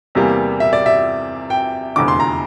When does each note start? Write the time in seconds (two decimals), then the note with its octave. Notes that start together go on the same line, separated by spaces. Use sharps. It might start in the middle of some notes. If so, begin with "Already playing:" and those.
0.15 E2 C3 E3 G3 A#3
0.60 E5
0.73 D5
0.86 E5
1.50 G5
1.96 F1 E2 D3 D6
2.08 C6
2.20 A#5